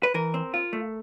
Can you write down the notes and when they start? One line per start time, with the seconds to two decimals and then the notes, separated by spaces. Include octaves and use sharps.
0.03 B4
0.14 E3 A#4
0.34 C4
0.54 F4
0.73 A3